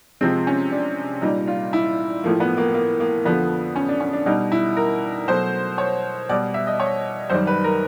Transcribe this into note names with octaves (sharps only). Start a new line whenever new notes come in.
C3 F3 G#3 C4
C#4
D4
A#2 G3 D#4
F4
E4
A2 F3 A3 A#3
B3
A#3
A#3
A#3
F2 D3 F3 A3 B3
C#4
D4
C#4
D4
B2 G3 D#4
E4
A#4
B2 F#3 A3 C5
C#5
B2 G3 D5
E5
D#5
C#5
F#2 D#3 G3 C5
B4
A#4